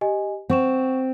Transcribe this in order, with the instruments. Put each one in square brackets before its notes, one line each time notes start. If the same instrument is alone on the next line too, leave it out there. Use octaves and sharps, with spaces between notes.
[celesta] G4 D#5 G#5
[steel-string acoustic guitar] C4 [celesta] F#5 C#6 E7